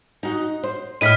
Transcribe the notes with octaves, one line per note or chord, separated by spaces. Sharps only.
D#4 F#4
C5
A2 E4 D#5 F6 B6 D#7